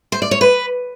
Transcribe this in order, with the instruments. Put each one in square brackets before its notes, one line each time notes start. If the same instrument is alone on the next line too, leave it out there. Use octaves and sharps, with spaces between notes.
[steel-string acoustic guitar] C5
D5
C#5
B4